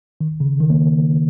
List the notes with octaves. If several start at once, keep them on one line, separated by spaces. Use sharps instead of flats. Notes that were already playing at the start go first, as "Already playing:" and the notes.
D#3
C#3
D#3
A#3